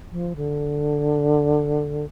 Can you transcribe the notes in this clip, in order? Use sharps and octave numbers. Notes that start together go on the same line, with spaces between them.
F3
D3